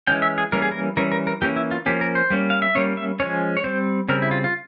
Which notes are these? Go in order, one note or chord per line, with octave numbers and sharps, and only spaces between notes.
E3 G#3 C#4 G5
E5
G#4
E3 G3 A#3 C#4 A#4
G#4
A#4
E3 G3 C#4 A#4
A#4
A#4
E3 A#3 C#4 G4
E4
F4
F3 A#3 C#4 G4
A#4
C5
G3 A#3 C#4
F5
E5
G3 A#3 C#4 C#5
E5
F3 G#3 C#4 C#5
C#5
G3 C4 C5
C#3 G3 C4 A#4
E4
F4
F4